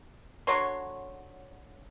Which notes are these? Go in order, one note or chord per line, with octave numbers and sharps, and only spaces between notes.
D3 F#3 C#5 C6